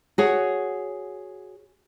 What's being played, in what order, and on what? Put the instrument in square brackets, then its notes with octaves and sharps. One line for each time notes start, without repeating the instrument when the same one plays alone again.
[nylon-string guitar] F#4 G#4 C#5